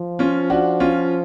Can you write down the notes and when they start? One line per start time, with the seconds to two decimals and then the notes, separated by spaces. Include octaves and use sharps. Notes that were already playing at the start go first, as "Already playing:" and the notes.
Already playing: F3
0.19 C#4 F4
0.50 D4 F#4
0.80 C#4 F4